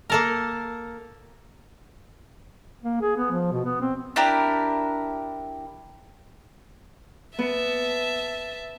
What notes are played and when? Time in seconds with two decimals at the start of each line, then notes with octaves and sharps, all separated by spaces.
0.10 A#3 A4 A#4
2.84 A#3
3.01 G#4
3.17 B3
3.31 F3
3.52 B2
3.65 B3
3.81 C4
4.16 D4 E4 G4 A#4
7.39 B3 E5 A5